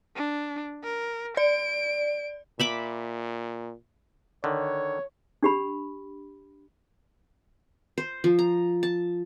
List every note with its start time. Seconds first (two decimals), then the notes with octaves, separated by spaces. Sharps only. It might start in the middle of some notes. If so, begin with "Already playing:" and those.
0.16 D4
0.84 A#4
1.37 D5 D7
2.60 A#2 E5 B5 D6
4.44 D3 D#3 C#5
5.43 D4 G4 B5
7.98 C5
8.24 F3
8.39 A#5
8.83 A5